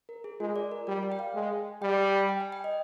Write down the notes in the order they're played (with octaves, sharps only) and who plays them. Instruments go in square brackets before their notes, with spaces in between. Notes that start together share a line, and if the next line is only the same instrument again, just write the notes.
[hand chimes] A#4
G#4
[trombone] G#3 [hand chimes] F4
[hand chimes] D5
A#4
[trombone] G3 [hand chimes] D5
[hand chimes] D5
G5
F5
[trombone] G#3
[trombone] G3 [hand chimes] G5
[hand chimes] G5
G#5
G5
D#5